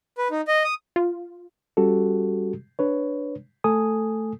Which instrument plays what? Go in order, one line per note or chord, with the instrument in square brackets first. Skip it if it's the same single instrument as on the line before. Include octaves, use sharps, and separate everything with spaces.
[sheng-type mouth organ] B4
D#4
D#5
D#6
[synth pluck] F4
[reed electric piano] G3 C#4 F#4 G4 A4
D4 B4 C#5
A3 A4 G#5 D#6